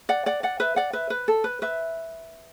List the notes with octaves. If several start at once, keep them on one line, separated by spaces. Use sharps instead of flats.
D5 F#5
D5 F#5
D5 F#5
B4 E5
D5 F#5
B4 E5
B4
A4
B4
B4 E5